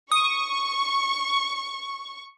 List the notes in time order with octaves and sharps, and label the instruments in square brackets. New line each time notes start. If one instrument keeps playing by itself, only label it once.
[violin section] C#6 [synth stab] D#6